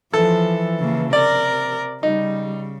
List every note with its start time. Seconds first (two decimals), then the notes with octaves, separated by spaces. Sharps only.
0.14 E3 F3 A4
0.80 C#3 A#3
1.13 C3 A#4 D5
2.03 C#3 G3 D#4